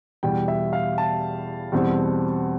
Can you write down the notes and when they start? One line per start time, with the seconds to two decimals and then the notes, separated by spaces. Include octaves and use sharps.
0.23 E2 B2 G3 G5
0.48 E5
0.73 F5
0.98 A5
1.72 E2 B2 G3 C4